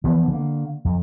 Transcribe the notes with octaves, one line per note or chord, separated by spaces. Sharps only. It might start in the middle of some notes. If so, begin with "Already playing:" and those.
E3 F3 B3
D3 A#3
F2